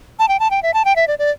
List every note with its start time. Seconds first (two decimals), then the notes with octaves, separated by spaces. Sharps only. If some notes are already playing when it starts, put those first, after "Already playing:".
0.19 A5
0.28 G5
0.40 A5
0.51 G5
0.63 E5
0.74 A5
0.85 G5
0.96 E5
1.08 D5
1.19 D5